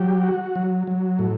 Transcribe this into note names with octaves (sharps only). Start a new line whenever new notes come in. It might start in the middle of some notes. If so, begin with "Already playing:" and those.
Already playing: F#3 G4
F#4
F#3
F#3
A2